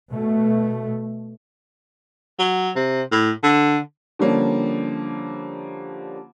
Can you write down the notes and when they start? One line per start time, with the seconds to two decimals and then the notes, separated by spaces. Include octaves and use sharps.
0.11 B2 A3
2.39 F#3
2.76 C3
3.11 A2
3.43 D3
4.19 D3 F3 G3 A#3 C#4